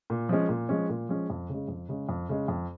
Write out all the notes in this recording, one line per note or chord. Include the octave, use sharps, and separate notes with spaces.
A#2
F3 G#3 C#4
A#2
F3 G#3 C#4
A#2
F3 G#3 C#4
F2
C#3 G#3
F2
C#3 G#3
F2
C#3 G#3
F2